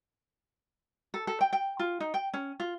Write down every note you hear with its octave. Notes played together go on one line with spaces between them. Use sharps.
A4
A4
G5
G5
F4
D#4
G5
C#4
F4